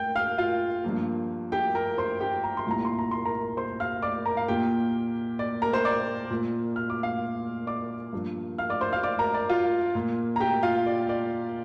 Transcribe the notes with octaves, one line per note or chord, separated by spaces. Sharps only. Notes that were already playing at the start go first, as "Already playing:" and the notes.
Already playing: A#2 G5 G6
F5 F6
F4 F5
G2 F3 A#3
G4 G5
A#4 A#5
C5 C6
G4 G5
A#5
C6
C2 A#2 A#3 A#5
C6
A#5
C6
A#4 A#5
C5 C6
F5 F6
D5 D6
A#4 A#5
F5
A#2 A#3 G4 G5
D5
A#4 A#5
C5 C6
D5 D6
A#2 A#3
F6
D6
F5 F6
D5 D6
G2 F3 A#3
F5 F6
D5 D6
C5 C6
F5 F6
D5 D6
A#4 A#5
D5
F4 F5
A#2 A#3
A#5
G4 G5
F4 F5
D5
D5